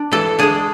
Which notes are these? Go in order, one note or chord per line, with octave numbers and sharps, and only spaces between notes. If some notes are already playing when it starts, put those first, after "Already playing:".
Already playing: D4
E3 A4
G#3 D4 G#4